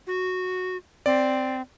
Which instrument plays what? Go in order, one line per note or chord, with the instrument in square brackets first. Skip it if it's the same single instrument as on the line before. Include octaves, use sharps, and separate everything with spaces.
[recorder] F#4
[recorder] C4 [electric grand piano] D5